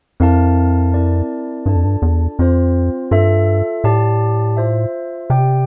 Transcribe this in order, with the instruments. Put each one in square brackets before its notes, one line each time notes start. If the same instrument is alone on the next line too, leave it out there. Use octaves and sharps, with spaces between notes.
[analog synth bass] F2 [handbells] C4 E4 A#4 F5 A5
[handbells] C4 E4 A#4 D5 A5
[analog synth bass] G2 [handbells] D4 F4 A4 D5 A5
[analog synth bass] F2
G2
E2
[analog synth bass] F2 [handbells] C4 F4 C5
[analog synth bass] G2 [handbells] F4 A4 E5
[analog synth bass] A2 [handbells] G4 D5 A5
[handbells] F4 C5 E5
[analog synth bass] C3 [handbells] G4 D5 G5